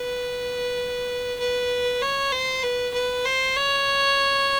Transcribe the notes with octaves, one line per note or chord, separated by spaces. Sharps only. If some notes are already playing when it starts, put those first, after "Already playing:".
Already playing: B4
B4
C#5
C5
B4
B4
C5
C#5